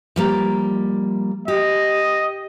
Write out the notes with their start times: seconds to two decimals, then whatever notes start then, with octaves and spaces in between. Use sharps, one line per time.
0.16 F3 G3 A#3
1.48 G4 D#5